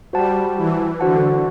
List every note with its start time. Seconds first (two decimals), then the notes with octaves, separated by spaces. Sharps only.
0.13 G3 F#4 C5 F#5 A5
0.56 E3
1.00 D3 F#4 C5 F#5 A5